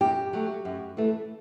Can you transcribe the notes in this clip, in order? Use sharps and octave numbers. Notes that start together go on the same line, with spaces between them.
F#2 G4
F#3 A3
F#2
E3 A3